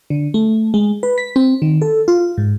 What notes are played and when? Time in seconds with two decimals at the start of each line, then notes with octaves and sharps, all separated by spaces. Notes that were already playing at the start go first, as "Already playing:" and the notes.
0.10 D3
0.34 A3
0.74 G#3
1.03 B4
1.18 B6
1.36 C4
1.62 D#3
1.82 A4
2.08 F4
2.38 G#2